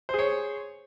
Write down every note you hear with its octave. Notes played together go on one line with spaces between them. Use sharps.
G#4 C5 C#5